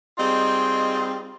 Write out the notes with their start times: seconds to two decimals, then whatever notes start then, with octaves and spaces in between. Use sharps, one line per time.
0.18 G3 C4 D#4 F4 G#4 D#5